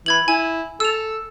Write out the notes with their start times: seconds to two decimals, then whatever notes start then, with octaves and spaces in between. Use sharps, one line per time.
0.06 E3 B5 G#6 F#7
0.28 E4 G#5
0.80 A4 E6 F7